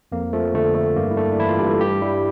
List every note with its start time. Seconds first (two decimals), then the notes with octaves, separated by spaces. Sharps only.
0.12 F2 A#3
0.33 F3 A3
0.54 D3 A3
0.75 A3
0.96 G2 A#3
1.11 E4
1.17 A3 D4
1.32 D4
1.38 E3 E4
1.48 F4
1.59 G2 G4
1.70 A4
1.81 G2 G4
2.02 G3 E4